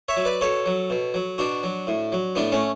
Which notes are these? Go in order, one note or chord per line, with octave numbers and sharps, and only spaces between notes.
C#5 E5
F#3
B4 D5
B2 A4 C#5
F#3
B2
F#3
B2 D4 F#4
F#3
A2
F#3
A2 B3 D4
A3 C#4